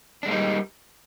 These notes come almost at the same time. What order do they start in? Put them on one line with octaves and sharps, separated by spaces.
D4 G#3 A#3 D#4 G3